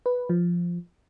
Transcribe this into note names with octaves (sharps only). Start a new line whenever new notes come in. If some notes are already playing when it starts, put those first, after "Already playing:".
B4
F3